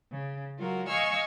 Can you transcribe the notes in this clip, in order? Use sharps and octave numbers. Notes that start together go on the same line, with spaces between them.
C#3
F#3 F4 F#4 A#4
D#5 F5 G#5 C#6 E6 F6